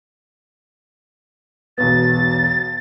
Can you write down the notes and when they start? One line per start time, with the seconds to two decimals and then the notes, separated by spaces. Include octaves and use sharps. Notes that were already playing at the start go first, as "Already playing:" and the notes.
1.78 E1 B1 B3 A6